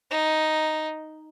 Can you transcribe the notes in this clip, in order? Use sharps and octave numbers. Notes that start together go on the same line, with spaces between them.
D#4